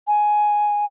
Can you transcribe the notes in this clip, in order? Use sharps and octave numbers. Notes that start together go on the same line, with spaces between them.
G#5